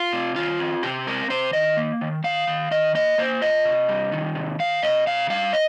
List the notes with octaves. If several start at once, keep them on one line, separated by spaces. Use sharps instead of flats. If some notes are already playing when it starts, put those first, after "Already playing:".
Already playing: F4
C3
D#3 F4
C4
C3 G4
C4 A#4
C3 C5
D#3 D#5
A#3
D#3
D#3 F5
D#3
D#3 D#5
A#3 D#5
A#3 C5
F4 D#5
C3
G3
D#3
C3
D#3 F5
C3 D#5
C3 F5
G3 F5
D#5